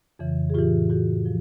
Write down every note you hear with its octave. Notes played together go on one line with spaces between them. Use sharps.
F2 C#3 E3
G#4
A2 E3 F4 G4
A2 E3 F#4 G#4
F3